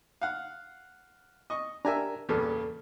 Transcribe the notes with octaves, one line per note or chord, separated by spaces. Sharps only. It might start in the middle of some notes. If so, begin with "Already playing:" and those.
F5 F#5
D#5 C#6
D4 G4 A#4 E5 G#5 A#5
E2 G2 A#2 C#3 A4